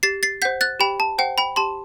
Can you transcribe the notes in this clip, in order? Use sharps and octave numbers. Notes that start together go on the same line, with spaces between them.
G4 A6 C7
A6 C7
C5 F#5 G6 B6
F#6 A6
G4 G5 B5
A5
C5 F#5 G5
G5 B5
G4 A5 C6